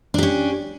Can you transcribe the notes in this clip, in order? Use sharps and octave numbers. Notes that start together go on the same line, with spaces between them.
C#4 D4 G4